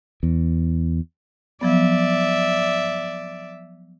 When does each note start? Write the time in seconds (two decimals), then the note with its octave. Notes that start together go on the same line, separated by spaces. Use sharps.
0.23 E2
1.61 F3 F#3 B3 D5 E5